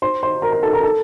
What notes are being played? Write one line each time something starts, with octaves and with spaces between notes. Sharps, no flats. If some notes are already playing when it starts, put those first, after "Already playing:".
C5 C6
C5 C6
A#4 A#5
A#4 A#5
A4 A5
A#4 A#5
A4 A5